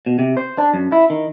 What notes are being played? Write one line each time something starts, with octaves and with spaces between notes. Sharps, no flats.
B2
C3
C5
D4
F#2
E4
D#3